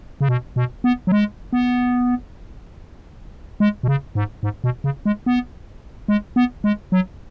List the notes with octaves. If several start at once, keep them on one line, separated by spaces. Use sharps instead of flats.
C#3
B2
B2
B3
F#3
G#3
B3
G#3
B2
C#3
G#2
G#2
B2
C#3
G#3
B3
G#3
B3
G#3
F#3